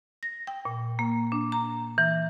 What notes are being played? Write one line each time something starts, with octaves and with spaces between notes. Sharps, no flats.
A#6
G5
A#2
A#3
D4
A#5
E3